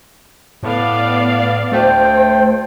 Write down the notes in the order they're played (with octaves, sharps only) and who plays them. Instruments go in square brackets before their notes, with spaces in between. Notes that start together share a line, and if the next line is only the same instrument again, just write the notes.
[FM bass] A2 [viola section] B3 D5 F5
[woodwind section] D2 G5 [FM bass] A3 [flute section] C5